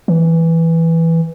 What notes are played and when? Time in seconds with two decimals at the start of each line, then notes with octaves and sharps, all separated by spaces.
0.08 E3